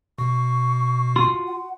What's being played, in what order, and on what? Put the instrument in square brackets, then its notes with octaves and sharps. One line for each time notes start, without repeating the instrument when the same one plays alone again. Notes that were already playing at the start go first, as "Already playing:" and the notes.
[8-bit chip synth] B2 [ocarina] C#6
[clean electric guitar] F4 F#4 C6
[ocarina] F#5